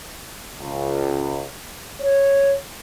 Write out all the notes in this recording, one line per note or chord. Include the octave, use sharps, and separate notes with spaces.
C#2
C#5